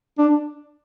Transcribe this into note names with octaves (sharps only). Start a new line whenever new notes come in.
D4